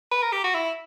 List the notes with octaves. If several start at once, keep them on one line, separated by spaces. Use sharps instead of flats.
B4
A#4
G4
F#4
E4